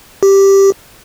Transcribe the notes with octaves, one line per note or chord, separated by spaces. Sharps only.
G4